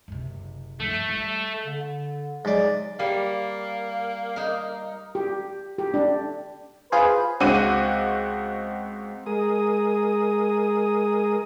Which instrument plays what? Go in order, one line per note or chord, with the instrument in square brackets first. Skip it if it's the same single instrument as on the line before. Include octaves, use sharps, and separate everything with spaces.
[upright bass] F#1 C3
[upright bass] G2 F3 [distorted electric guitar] A3
[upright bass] G3
[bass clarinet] D3
[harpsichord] G#2 D5 [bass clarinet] F#3
[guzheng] G3 [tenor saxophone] A#3
[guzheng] D#4 A#4
[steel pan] G4
G4
D4
[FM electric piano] F4 G#4 C5 [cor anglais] B4
[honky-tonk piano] C#2 C4 F#4 D6 D#7
[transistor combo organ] G#3 G#4 A#4 D#6